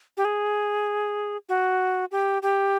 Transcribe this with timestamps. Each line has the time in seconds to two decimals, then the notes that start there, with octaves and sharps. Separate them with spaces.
0.17 G4
0.25 G#4
1.49 F#4
2.11 G4
2.42 G4